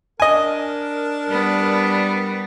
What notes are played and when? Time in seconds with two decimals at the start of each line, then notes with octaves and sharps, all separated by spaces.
0.20 D4 A#4 D#5 G#5
1.29 G3 B3